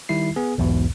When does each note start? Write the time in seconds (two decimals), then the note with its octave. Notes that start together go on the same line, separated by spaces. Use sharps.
0.09 D#3 G3 E4 C7
0.36 B3 G#4
0.58 B1 E2 G#2 B2